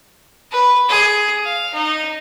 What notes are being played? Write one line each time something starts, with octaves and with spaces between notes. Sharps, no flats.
B4
G#4
F5
D#4